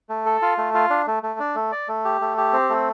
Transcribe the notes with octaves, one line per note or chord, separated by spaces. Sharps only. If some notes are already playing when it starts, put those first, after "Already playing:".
A3
A4
F4
A3
F4
D4
A3
A3
D4
A3
D5
A3
G4
A3
G4
C4
A3